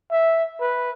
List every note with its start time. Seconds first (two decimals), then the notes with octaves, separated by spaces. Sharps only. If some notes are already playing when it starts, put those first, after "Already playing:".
0.11 E5
0.61 B4